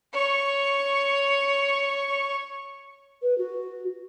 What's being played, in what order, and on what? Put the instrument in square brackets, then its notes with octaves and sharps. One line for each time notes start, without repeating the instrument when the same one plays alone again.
[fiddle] C#5 C#6
[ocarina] B4
F#4